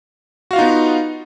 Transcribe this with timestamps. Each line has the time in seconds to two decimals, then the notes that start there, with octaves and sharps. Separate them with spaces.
0.51 F#4
0.53 F5
0.56 F4
0.59 D#4
0.61 B3